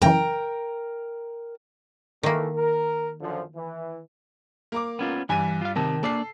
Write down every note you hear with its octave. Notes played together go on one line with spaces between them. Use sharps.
F#2 C#3 E3 A#4 G5 A#5
D#3 E3 A3 A#3
A#4
F#2 D3 F3
E3
A#3 A#5 D6
B3 C#4 F4
G2 E3 G3 G#5 D#7
F4 F5
C3 D#3 A#4 A5
A#3 D4 A4 D5 C7